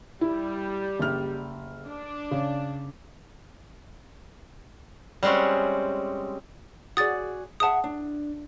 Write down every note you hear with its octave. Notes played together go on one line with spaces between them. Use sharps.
G3 E4
F#1 F6
D4
C#3
G3 G#3 C4 C#4 F#4
F#4 G#4 D5 D#6 A6
G#4 E5 F#5 A5 D#6
D4